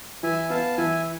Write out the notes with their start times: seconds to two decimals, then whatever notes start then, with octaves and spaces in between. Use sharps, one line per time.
0.23 E3 E5 G#5
0.50 B3 F5 A5
0.77 E3 E5 G#5